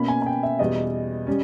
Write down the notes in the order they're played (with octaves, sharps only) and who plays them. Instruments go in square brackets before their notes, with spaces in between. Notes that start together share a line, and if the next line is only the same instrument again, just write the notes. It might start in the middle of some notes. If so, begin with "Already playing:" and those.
Already playing: [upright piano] B2 A#3 C#4 B5
G#5
G#5
G5
E5
E2 B2 G3 D#5
G3 C#4